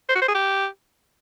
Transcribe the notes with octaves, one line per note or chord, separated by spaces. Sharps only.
C5
F#4
C5
G#4
G4